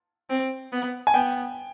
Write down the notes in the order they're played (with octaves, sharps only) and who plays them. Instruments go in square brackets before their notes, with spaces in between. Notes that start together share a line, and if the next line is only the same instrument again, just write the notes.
[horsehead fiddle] C4
B3
[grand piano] G#5
[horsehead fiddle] B3 [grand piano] G5